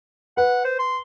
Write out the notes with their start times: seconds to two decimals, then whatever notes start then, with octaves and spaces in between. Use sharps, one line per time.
0.37 B4 F#5
0.65 C5
0.79 C6